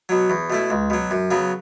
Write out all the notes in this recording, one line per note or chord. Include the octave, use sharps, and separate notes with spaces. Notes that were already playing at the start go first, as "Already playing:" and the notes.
B2 F#3
E2
B2 A3 E4
C#2
B2 F#3
F#2
C#3 F#3 B3